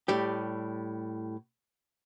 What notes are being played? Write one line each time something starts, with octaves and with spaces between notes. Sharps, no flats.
A2 G3 G4